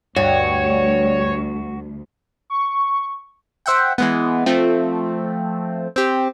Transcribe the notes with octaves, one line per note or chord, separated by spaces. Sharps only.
D2 G2 F#4 C#5
C#6
C5 E5 F#5 G5
E3 G#3 B3
F3 A3 C4
C4 G4